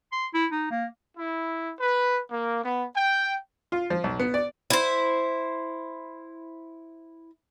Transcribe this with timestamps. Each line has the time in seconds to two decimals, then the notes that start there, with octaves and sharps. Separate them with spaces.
0.12 C6
0.34 E4
0.52 D#4
0.71 A#3
1.18 E4
1.80 B4
2.31 A#3
2.64 B3
2.96 G5
3.72 F4
3.90 F3
4.04 B1
4.20 B3
4.34 D5
4.70 E4 C5